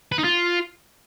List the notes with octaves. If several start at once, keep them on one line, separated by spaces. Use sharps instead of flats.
B4
D#4
F4